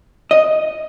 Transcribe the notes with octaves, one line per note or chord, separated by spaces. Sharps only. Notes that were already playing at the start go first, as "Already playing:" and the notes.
D#5